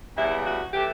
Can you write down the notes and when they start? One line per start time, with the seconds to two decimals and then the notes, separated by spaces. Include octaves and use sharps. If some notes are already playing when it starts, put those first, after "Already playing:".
0.16 E2 C#3 E3 G3 E4
0.46 F#4
0.73 E3 A3 G4